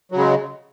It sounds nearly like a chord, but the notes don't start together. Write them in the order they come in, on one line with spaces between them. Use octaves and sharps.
F#3 C#3 G#3